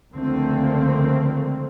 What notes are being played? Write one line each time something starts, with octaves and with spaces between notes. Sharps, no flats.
C#2 D3 F3 A3 A#3 C4